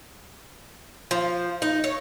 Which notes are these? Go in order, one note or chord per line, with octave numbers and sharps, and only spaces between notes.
F3
D#4
C#5